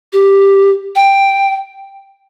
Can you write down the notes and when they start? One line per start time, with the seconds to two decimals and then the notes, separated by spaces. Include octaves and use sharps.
0.13 G4
0.96 G5